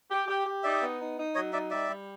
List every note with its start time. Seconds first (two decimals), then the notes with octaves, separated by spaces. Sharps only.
0.09 G4
0.28 G4
0.46 G4
0.63 D#4 D5 E5
0.81 B3
1.00 D#4
1.18 D#4
1.35 F#3 C#5 D#5
1.53 D#4 D5 E5
1.70 G3 D5 E5
1.89 G3